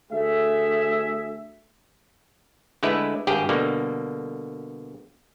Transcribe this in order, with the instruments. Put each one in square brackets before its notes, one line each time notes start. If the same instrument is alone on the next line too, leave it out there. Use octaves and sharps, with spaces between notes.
[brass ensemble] D2 A3 G#4 E5
[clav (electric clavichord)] D3 G#3 A3 E4 B4
G#1 G2 G4 G#4 G5
B2 D3 G3 A#3